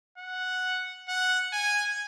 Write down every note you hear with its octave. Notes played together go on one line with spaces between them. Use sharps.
F#5
F#5
G#5